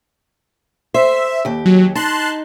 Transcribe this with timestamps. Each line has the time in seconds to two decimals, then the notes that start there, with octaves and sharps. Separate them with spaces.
0.94 C5 E5
1.45 D#2 G4
1.66 F#3
1.95 D#4 A5 C6 F#6